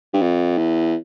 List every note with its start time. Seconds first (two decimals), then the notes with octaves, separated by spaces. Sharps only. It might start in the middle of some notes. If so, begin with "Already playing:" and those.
0.14 G2
0.22 F2
0.58 E2